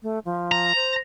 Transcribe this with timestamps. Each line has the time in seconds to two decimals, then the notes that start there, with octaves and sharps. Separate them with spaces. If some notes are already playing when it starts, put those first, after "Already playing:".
0.03 A3
0.25 F3
0.52 A#5
0.75 C5